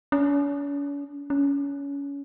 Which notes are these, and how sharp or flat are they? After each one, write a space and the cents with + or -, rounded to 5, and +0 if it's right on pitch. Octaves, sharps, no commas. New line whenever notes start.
C#4 +45
C#4 +25